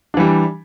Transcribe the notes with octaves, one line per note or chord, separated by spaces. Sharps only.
E3 G3 D4